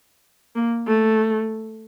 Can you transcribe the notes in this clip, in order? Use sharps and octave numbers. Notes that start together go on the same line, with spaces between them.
A#3
A3